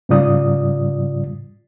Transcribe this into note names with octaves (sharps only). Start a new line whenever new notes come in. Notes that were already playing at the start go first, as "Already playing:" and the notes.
G#2 C#3 G3 F4 D5 D#6